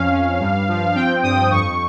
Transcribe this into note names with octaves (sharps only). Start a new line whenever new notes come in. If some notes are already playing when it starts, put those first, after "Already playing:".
Already playing: F2 C#4 F5
C#4
G2
F3
C4 G5
G2 D#6
F2 C#6